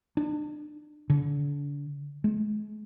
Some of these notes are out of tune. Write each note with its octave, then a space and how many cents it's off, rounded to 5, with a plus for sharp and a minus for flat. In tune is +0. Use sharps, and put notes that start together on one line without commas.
D4 +35
D3 -35
G#3 +40